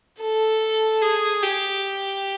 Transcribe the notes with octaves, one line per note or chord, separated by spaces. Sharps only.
A4
G#4
G4